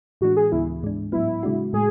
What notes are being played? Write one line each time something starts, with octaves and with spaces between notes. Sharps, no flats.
A2 E3 G#3 D4 F#4
G#4
D2 C#3 E3 B3 E4
G#2 G#3 D4
A2 F#3 B3 E4
C#3 G#3 D4 F#4
A2 G#3 G#4